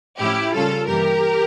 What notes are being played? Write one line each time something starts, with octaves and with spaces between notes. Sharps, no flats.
A2 F3 C#4 E4 G4
C#3 G3 A#3 C#4 F4 A4
G2 E3 G3 A#3 G4 A#4